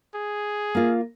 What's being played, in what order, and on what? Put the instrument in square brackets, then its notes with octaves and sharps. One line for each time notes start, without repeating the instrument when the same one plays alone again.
[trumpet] G#4
[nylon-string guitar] A#3 F4